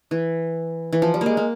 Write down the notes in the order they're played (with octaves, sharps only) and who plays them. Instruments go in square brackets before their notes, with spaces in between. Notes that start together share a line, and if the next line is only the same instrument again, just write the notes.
[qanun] E3
E3
F3
G3
G#3 A#3
A#3